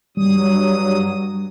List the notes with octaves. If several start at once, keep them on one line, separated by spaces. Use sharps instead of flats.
G2 F#3 G3 D#6